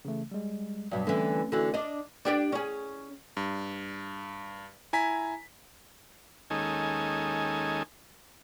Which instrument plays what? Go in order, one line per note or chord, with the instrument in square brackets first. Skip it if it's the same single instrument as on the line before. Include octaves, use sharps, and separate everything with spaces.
[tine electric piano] C#3 E3 A3
G3 G#3
[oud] G2 B2 [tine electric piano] F#3 D5
[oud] D3 E3 [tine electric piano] A3 C4 C#4
[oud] D3 E3 F#4
D4 D#5
D4 G4 D5
C#4 G#4
[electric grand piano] G2
E4 G#5 A#5 B6
[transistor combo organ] D#2 G#3 C#4 D#4 A4 G#5